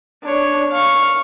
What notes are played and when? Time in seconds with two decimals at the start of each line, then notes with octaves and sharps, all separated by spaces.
0.23 D4 C#5
0.71 F5 C#6